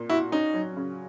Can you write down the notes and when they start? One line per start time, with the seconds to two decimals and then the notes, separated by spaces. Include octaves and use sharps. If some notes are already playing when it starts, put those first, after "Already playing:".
Already playing: A#2 A#3
0.10 E4 F#4
0.32 C#4 D#4
0.54 F#3
0.77 C#3